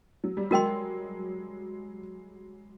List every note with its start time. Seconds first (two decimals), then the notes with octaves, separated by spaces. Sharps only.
0.24 F#3
0.37 G3
0.51 F#3 G#3 F#4 A#4 D#5 G5 C6